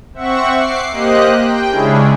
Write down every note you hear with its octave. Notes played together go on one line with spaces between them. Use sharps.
C4 E5 F#5 C#6
D6 C7
A#3 G4 C5 D#5 F#6
G5
C#3 G#3 C#4 D4 E4 G#4